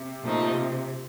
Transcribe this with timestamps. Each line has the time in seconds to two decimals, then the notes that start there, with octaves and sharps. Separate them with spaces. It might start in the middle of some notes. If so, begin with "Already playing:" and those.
Already playing: C3
0.24 A#2 F3 A3 D#4